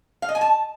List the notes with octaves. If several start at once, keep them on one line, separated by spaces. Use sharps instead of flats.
F5
D#5
G#5
A5